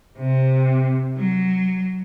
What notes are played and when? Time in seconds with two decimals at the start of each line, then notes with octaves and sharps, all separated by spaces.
0.18 C3
1.17 F#3